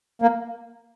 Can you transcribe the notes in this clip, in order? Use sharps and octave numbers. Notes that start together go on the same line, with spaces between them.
A#3